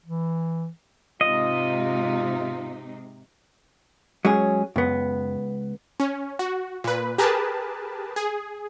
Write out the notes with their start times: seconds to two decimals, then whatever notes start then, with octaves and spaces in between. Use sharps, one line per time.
0.06 E3
1.21 G#2 C3 D#4 F4 D#5
4.25 F#3 G#3 C#4 G#4
4.76 C#2 F#2 B3
6.00 C#4
6.39 F#4
6.84 A#2 B4
7.18 G4 G#4 A#4 B4 A5
8.16 G#4